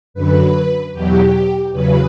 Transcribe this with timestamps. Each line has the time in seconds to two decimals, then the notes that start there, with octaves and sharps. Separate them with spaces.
0.14 F#2 D3 F#3 B4
0.93 E2 B2 F#3 G4
1.73 E2 C#3 F#3 B4